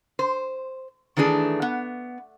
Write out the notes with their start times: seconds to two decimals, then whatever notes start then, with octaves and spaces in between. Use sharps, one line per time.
0.19 C5
1.17 D#3 E3 A3 D4 G#4
1.62 B3